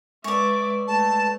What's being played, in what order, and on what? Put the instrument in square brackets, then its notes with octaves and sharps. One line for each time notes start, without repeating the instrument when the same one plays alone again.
[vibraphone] G#3 B4 [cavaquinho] C#5 D5 [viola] E5 D6
[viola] A3 [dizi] A5